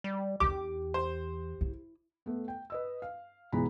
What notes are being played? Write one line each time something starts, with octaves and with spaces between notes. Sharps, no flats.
G3
E2 D4 G4 D6
C5
E4
A3 B3
G5
B4 D#5 E6
F5
B1 E3 G#3 B3 A#5 B5